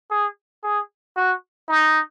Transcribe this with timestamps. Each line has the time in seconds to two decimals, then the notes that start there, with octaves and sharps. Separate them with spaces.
0.11 G#4
0.63 G#4
1.17 F#4
1.68 D#4